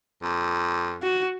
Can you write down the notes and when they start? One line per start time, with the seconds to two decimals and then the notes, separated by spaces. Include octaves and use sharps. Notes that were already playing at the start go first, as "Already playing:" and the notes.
0.22 F2
1.03 F#4